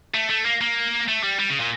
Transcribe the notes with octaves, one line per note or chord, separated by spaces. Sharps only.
A3
A3
A#3
A#3
A3
G3
G3
C#3
A#2